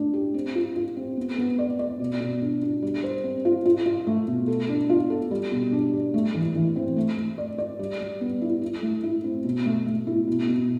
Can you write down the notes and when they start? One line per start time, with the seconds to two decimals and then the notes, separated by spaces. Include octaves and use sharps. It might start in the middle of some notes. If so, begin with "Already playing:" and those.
Already playing: A3 D4
0.13 G4
0.34 C4
0.55 F4
0.76 F4
0.97 C4
1.17 B3
1.38 B3
1.59 D5
1.79 D5
2.00 B2
2.20 B2
2.42 D4
2.62 D4
2.82 G3
3.04 C5
3.24 C4
3.45 F4
3.65 F4
3.86 F4
4.07 A3
4.28 B2
4.48 A4
4.69 D4
4.90 F4
5.10 A4
5.31 G3
5.52 B2
5.72 D4
5.93 G3
6.14 A3
6.34 E3
6.55 E3
6.76 C4
6.96 A3
7.17 A3
7.38 D5
7.58 D5
7.79 G3
8.00 G3
8.21 B3
8.42 E4
8.62 E4
8.82 A3
9.03 E4
9.24 C4
9.44 B2
9.65 A3
9.86 A3
10.07 E4
10.27 B2
10.48 B2